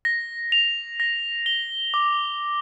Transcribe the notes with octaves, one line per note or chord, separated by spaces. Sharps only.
A#6
F7
A#6
G7
D6